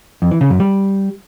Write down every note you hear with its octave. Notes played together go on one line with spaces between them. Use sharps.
F2
E3
C#3
F#2
G3